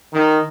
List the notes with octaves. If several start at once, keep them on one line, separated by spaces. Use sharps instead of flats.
D#3